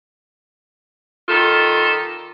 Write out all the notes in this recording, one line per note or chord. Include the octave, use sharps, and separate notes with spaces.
D#3 G3 F4 A4